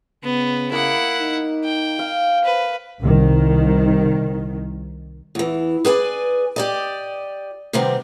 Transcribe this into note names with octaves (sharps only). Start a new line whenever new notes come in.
C#3 B3
A#3 E4 F#5 D#6
D#4
G5
F5
B4 C5
C2 D#3
E2 E3
G#4 B4 D5 G#5
G4 D5 D#5
C3 D#3 G3 B3 C4